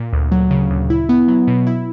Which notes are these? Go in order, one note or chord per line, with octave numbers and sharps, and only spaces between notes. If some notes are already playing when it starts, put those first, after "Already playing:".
Already playing: A#2
D2
F#3
C#3
D2
E4
B3
F#3
B2
E4